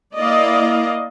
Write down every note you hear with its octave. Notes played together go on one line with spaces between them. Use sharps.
A#3 E4 D5 D#5 F5